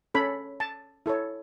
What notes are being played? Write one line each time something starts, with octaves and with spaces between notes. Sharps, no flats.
C#4 A4 C#5 B5
A5
E4 A4 C#5